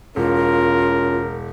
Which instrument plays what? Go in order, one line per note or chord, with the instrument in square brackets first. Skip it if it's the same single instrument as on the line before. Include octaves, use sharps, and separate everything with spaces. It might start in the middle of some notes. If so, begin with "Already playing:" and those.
[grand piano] E1 [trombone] C#4 [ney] F4 [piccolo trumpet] A#4